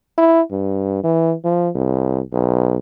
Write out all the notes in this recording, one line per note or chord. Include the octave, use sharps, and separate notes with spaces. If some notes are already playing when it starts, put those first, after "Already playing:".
E4
G2
E3
F3
C2
B1